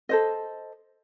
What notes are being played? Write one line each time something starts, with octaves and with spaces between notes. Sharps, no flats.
A4 C5 D#5